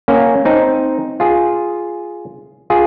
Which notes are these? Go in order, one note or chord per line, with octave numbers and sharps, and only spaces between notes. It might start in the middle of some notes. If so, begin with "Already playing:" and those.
A#3 C#4
C4 D#4
F4 G#4
F4 G#4